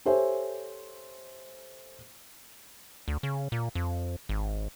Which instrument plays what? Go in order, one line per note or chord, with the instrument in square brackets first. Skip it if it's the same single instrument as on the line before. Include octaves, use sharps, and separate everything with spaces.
[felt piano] G4 A4 C5 C#5 E5 G#5
[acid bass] D2
C#3
A#2
F2
G#1